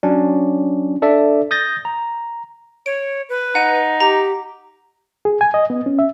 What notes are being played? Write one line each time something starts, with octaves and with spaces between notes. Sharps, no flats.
F#3 C#4 D4
D4 A4 D5 E5
D#6 G6 A6 A#6
A#5
C#5 D7
B4
D#4 F#5 D#7
G4 A#5
G#4
G#5
D#5
B3
C#4
E5